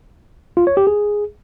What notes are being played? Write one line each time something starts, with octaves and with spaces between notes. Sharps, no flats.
F4
C#5
G4
G#4